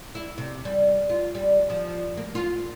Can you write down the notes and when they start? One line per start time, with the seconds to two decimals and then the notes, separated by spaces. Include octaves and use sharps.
0.15 E4
0.38 C3
0.65 G3
1.10 F4
1.35 G3
1.70 F3
2.17 A#3
2.35 F4